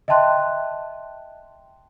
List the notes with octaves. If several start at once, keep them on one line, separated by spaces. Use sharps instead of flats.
D#5 E5 G5 A5 C6 F#6